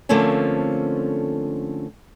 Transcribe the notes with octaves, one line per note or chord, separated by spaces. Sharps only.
D3 F3 A3 A#3 C4 C#4